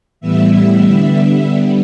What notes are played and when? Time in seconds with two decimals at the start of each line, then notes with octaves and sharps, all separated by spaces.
0.20 A2 E3 G3 B3 E5
0.82 D3 G3 B3 E5
1.44 D3 G3 B3